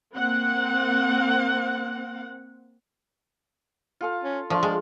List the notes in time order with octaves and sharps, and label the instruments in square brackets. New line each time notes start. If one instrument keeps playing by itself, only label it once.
[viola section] A#3 C4 F#5
[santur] F4 A4 A5
[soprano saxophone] C#4
[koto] F3 [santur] A3 F4 C6 [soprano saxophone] D4
[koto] G#3